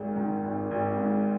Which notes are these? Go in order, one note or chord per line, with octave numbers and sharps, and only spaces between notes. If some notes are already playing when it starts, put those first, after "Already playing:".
Already playing: G#1 G#2
D#3
G#1
G#1
G#2